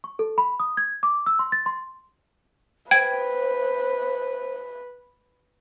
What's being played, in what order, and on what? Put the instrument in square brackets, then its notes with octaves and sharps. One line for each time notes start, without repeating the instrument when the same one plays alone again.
[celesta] C#6
A4
B5
D#6
G#6
D6
E6
C6
A6
C6
[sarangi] B4 [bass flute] C5 [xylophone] G5 G#6